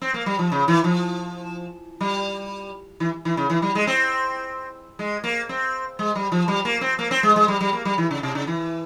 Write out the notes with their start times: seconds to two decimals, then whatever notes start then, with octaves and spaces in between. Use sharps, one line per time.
0.02 C4
0.14 A#3
0.26 G3
0.39 F3
0.52 C#3
0.68 E3
0.84 F3
2.01 G3
3.00 E3
3.25 E3
3.37 C#3
3.50 E3
3.62 G3
3.75 G#3
3.87 C4
4.99 G#3
5.24 A#3
5.49 C4
5.99 G#3
6.15 G3
6.32 F3
6.48 G3
6.65 A#3
6.81 C4
6.99 A#3
7.11 C4
7.23 G#3
7.36 G#3
7.48 G3
7.61 G3
7.73 A#3
7.85 G3
7.98 E3
8.11 C#3
8.23 C3
8.35 C#3
8.47 E3